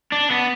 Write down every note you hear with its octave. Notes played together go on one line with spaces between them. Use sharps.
D4
B3